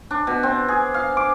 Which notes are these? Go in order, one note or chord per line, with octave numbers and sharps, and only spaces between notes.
D4
B2
C4
G#4
F5
D6